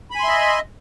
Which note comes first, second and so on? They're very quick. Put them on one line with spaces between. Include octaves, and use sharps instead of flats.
B5 G#5 C6 E5 D#5